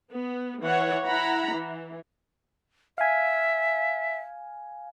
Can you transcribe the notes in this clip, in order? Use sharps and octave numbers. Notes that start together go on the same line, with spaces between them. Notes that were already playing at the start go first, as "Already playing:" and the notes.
B3
E3 C#5 F#5
E4 F#5 A#5 B5
E3
E5 F5 G#5